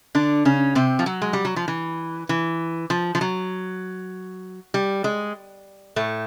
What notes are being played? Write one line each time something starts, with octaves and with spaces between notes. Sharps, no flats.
D3 D4
C#3 C#4
C3 C4
F3
F#3
G#3
G3
F#3
F3
E3
E3
F3
F3
F#3
G3
G#3
A2 A3